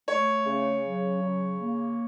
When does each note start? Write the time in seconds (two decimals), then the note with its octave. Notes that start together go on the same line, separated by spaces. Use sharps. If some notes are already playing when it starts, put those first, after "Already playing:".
0.08 A3 C#5
0.45 C#3
0.84 F#3
1.21 C#3
1.59 A#3